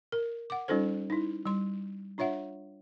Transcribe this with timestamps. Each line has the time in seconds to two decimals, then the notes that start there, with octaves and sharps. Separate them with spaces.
0.12 A#4
0.50 F#5 D6
0.68 G3 C#4 D#4 F4 A4 C5
1.10 D#4 E4
1.46 G3 C6
2.18 D4 F4 C#5 E5 F#5